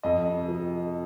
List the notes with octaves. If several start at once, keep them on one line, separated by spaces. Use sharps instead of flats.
F2 D#5
C3
F3